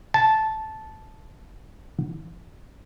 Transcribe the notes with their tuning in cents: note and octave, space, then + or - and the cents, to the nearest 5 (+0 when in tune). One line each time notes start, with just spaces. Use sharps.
A5 -10